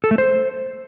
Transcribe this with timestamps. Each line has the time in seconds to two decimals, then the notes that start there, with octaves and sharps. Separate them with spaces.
0.04 A4
0.11 A3
0.18 C5